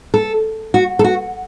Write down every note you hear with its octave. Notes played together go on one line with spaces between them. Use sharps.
A4
F#4
A4
F#4